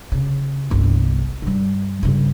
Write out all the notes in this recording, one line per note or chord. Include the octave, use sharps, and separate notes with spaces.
C#3
G1 C2
G2 G3
G2 C#3